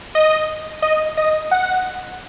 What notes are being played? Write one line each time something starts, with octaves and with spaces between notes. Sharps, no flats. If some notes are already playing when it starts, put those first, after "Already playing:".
D#5
D#5
D#5
F#5